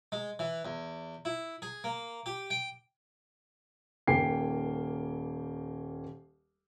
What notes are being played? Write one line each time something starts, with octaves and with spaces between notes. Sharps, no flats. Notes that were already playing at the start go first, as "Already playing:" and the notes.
G#3
E3
E2
E4
G#4
A#3
G4
G5
D#1 A#3 G5 G#5 C7